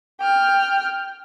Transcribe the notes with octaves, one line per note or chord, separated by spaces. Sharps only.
G5 F6